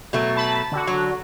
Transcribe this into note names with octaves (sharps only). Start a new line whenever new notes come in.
B2 F#3 A3
A5 B5
D3 F#4
F#3